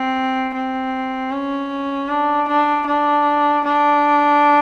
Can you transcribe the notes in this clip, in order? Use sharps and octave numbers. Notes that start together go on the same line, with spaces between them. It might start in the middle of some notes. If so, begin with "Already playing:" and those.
Already playing: C4
C4
C#4
D4
D4
D4
D4